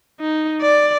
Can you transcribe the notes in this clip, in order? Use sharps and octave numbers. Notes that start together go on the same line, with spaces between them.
D#4
D5